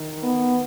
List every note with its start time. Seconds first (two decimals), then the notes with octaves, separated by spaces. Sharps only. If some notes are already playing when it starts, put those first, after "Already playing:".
Already playing: D#3
0.23 B3